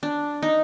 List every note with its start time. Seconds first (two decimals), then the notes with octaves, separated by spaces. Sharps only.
0.03 D4
0.42 D#4